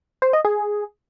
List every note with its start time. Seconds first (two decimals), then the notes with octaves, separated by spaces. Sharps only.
0.22 C5
0.33 D#5
0.45 G#4